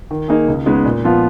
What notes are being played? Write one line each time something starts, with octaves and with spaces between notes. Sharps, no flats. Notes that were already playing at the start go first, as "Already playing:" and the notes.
D#3
A#3 D#4 G#4
C#2
C#3 G#3 B3 D#4
A#2
F3 B3 F4